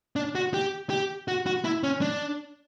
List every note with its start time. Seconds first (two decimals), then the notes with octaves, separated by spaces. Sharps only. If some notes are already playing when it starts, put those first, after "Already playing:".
0.16 D4
0.35 F#4
0.54 G4
0.90 G4
1.28 F#4
1.46 F#4
1.64 E4
1.83 C#4
2.01 D4